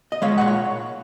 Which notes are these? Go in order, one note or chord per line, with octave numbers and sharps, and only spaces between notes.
D#5
G#3 C#5 F5
A#2 F#5
C#5